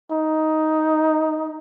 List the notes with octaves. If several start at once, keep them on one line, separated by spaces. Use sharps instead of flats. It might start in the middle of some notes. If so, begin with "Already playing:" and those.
D#4